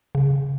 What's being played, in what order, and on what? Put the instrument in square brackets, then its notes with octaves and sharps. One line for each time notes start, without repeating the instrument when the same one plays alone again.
[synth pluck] C#3